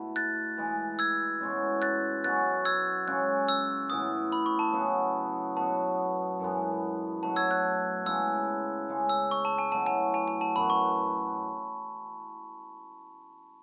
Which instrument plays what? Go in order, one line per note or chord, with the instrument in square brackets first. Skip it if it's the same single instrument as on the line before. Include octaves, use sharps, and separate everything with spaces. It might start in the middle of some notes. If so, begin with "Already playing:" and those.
Already playing: [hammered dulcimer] B2 A3 E4
[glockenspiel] F#6 A6
[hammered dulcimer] E3 G#3 D#4
[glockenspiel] E6 G#6
[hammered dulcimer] B2 G#3 C#4 E4
[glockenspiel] F#6 A6
[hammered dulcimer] B2 F#3 C#4 F#4 [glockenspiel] F#6 A6
[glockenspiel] E6 G#6
[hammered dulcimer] C#3 G#3 C#4 [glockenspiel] F#6
[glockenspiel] E6
[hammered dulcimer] A2 E3 B3 [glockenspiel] D#6
[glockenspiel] B5
C#6
A5
[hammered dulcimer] C#3 F#3 B3 E4
[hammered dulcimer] B2 F#3 B3 [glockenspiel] A5
[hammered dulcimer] F#2 E3 G#3 B3
[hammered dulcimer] B2 F#3 A3 [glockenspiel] A5
[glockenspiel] E6 G#6
F#6
[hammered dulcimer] C#3 G#3 B3 E4 [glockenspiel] E6
[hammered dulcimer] C#3 G#3 D#4
[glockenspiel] E6
C#6
A5
G#5
[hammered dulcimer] B2 F#3 A3 E4 [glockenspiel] A5
[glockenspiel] G#5
G#5
G#5
A5
[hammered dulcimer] F#2 E3 B3 F#4 [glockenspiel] B5
[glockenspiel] C#6